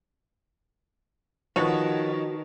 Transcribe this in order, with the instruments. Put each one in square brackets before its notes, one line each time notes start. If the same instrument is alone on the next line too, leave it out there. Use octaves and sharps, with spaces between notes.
[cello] D#3 [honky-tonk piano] F3 C#5 [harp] D#4 B4 [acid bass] F#4